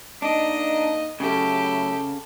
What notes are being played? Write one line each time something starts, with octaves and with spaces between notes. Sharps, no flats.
A#3 D4 D#4 D#5
C#3 F#3 A3 E4 G4 A4